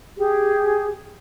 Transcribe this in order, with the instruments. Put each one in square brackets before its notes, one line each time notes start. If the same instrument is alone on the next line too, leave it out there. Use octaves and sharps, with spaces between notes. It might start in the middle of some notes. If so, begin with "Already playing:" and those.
[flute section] G4 G#4